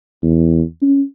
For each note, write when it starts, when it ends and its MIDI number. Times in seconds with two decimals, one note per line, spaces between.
0.23 0.62 40
0.82 1.02 61